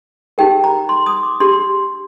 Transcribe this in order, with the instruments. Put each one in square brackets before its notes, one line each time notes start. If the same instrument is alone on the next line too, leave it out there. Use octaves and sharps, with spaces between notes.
[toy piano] D#4 G4 A#4 G5
A#5
C6
D#6
D6
D4 G4 C6